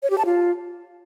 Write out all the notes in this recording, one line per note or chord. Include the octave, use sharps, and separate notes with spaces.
C#5
G4
A5
F4